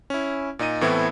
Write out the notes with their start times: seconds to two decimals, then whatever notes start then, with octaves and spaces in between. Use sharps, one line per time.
0.10 C#4 E4
0.59 A#2 D#4 D#5 D#7
0.81 A2 E3 A3 B3 C4 E4